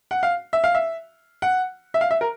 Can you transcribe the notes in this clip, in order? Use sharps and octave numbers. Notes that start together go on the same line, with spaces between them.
F#5
F5
E5
F5
E5
F#5
E5
F5
E5
A#4